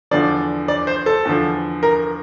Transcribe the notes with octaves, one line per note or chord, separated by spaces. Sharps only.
E2 D3 F3 D5
D5
C5
A4
E2 D3 F3
A#4